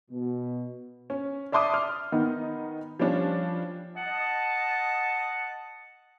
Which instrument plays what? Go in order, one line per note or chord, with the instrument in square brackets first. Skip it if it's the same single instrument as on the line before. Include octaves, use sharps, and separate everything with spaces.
[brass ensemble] B2
[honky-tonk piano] C#4
D5 E5 A5 C6 D6 D#6
F6
D#3 B3 D#4
F3 G3 C#4 D4 F4
[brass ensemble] D#5 A5 [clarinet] F#5